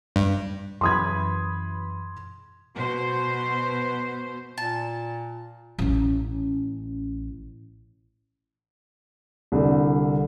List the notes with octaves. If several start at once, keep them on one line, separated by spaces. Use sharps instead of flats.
G2
F#2 E3 B5 C6 D#6 G#6
B2 C5
A#2 A5
A1 C#4
C2 D3